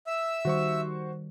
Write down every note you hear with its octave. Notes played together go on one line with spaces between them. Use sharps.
E5 E6
D#3 G3 F#4 C5 C#6